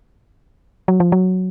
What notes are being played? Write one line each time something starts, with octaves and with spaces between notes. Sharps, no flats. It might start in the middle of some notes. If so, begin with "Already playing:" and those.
F#3
F3
F#3